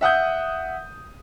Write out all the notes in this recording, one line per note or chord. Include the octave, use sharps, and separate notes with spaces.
E5 F#5 D#6 G6